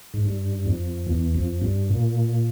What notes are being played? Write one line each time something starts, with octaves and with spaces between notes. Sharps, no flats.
G#2
G2
F2
E2
F2
G2
A#2